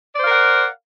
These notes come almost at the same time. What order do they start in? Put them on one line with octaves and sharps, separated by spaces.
D5 C5 F5 A#4 F#5